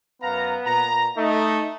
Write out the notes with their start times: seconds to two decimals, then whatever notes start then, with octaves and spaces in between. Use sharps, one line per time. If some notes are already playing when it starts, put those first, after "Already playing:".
0.22 F#2 B3 F5 A#5
0.65 A#2 A#5
1.17 A3 D#4 D#5